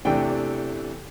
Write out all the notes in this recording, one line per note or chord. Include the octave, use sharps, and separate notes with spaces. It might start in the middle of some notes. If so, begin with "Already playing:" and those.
E2 C3 E3 A3 D4 G5